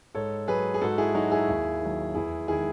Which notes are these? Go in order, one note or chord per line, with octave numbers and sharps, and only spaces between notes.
G#2 A4 C#5
F#3 G#4 B4
G#4
G#2 F#4 A4
E4 G#4
F#3 D#4 F#4
E4 G#4
D#2
D#3 F#3
E2 E4 G#4
D#3 G#3 E4 G#4